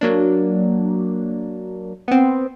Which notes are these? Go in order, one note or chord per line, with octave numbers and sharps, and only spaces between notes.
F#3 A#3 D4
B3 C4